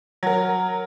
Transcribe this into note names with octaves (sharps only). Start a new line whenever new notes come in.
F#3 A#4